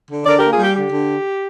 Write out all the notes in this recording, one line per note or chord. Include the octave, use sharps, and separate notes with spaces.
D3
D3 A#4 D5
A#3 G4 A#4
F4 G#4
G3 G4
D3 G4
D3